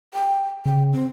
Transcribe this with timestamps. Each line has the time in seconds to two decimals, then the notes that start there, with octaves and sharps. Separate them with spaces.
0.14 G5
0.66 C#3 G5
0.93 C4